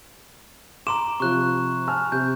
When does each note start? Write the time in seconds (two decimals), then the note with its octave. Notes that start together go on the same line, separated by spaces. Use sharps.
0.87 A#5 C6 D6 E7
1.20 C3 F3 C#6 F#6
1.87 G#5 A5 F6
2.12 C3 G6